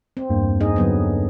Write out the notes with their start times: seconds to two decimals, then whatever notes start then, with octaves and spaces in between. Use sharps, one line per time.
0.17 C4
0.30 E2 G2 A#3
0.61 D#4 G#4 D#5
0.76 D3 F#3 B3